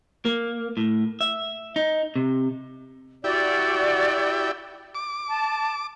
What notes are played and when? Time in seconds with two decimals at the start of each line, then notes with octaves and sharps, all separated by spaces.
0.25 A#3
0.77 A2
1.21 E5
1.76 D#4
2.16 C3
3.24 E4 F#4 G4 D5
4.95 D6
5.29 A5